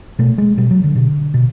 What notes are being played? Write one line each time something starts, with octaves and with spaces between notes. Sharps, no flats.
B2 A3
G#3
B2 G3
F#3
D3
B2
B2